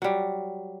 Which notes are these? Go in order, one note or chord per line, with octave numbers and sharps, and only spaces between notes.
F#3 G3